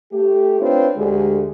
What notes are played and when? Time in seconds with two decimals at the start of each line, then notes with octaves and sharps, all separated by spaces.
0.12 A3 G4
0.61 C4 D4 F4 B4 C#5
0.97 D2 D3 G#3 G4 G#4